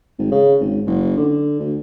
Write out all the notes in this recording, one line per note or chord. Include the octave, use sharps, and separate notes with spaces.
G#1
C#3
G#1
F#1
D3
D2